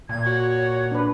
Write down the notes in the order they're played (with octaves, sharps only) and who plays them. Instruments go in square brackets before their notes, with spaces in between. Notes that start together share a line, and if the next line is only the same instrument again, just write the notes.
[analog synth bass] A#2 [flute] G#6
[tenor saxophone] F#4 [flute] C#5
[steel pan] D4 B4